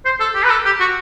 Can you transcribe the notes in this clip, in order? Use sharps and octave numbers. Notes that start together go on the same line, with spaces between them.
C5
A4
G4
B4
A4
G4
F#4